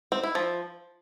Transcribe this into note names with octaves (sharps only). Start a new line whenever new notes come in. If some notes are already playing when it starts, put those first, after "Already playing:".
C4
E4
F3